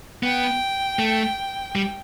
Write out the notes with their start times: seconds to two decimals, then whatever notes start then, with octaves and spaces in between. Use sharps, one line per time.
0.22 B3 G5
0.99 A3
1.76 G3